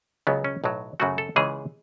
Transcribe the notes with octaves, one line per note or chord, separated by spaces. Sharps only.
C#2 C#3 F#3 B3
C#4
B1 A2 F#3
F#2 C#3 F#3 A3 F#4
A4
C#2 C#3 E3 G#3 G#4